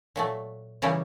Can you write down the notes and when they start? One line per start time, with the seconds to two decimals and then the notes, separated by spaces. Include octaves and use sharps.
0.16 A#2 F#3 A3
0.82 C#3 E3 G3 A#3 C#4